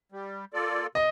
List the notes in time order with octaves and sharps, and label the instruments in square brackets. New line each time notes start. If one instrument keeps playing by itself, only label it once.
[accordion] G3
A#3 F4 A4 D5
[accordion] C3 [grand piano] D#5